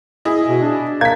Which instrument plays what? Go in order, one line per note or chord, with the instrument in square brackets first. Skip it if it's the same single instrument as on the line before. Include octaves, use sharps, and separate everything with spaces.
[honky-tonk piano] E4 G#4 D#5
[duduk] B2
D4
[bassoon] A#3 [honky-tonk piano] G#6 B6